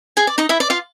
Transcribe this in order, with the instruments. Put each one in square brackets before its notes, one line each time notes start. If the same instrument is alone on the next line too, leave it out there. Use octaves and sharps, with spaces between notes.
[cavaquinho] G#4 G#5
D5
D#4 D#5
E4 E5
D5
F4 F5